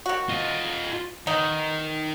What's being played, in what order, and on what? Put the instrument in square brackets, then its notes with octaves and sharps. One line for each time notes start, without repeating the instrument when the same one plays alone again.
[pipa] D#3 F#4
[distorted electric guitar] F4 D#5
[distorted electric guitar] D#3 [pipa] B3 D#4